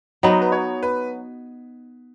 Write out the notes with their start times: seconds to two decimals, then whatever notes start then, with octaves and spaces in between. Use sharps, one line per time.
0.23 F#3 B3 D#4 D#5
0.42 B4
0.52 C#5
0.83 B4